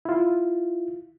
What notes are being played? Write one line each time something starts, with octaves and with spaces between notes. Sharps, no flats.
E4 F4